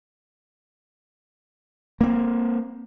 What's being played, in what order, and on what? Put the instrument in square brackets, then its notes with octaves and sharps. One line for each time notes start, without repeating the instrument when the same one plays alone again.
[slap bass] A#3 C4